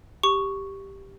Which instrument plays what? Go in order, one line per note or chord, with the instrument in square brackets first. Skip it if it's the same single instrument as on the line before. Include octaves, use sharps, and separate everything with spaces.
[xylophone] G4 C#6